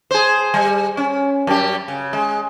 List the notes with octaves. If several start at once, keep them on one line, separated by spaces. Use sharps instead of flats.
G#4 C5
G3
C#4
F#2 G3 G4
C#3
G#3